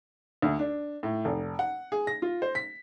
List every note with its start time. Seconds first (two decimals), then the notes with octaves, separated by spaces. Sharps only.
0.42 D2
0.59 D4
1.03 A2
1.25 F1
1.59 F#5
1.92 G#4
2.07 A#6
2.22 F4
2.42 C5
2.55 B6